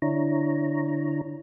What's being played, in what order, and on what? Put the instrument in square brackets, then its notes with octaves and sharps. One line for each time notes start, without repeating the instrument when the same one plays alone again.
[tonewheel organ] D3 D4 E4 C#5 A#5